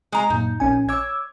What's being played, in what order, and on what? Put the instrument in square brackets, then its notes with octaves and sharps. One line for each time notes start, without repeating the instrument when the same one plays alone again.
[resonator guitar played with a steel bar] G#3 A#5
[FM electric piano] F#2 A#2 [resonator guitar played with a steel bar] D#4
[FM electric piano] A#1 C#4 G#5
[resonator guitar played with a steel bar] C#5 [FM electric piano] D6 E6 G#6